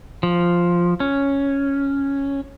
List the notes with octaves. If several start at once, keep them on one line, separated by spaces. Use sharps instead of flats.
F3
C#4